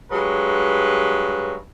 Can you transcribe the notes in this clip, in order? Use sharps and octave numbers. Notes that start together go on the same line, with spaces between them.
G2 F#3 G#3 B4